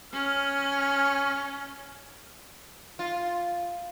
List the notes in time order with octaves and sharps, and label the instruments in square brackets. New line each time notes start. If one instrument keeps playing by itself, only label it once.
[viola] C#4 [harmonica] F6
[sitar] F4